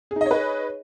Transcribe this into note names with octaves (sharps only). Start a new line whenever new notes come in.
D#4 G#4 B4 C#5 D#5